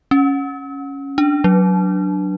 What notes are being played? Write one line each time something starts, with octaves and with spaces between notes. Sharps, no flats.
C#4
D4
F#3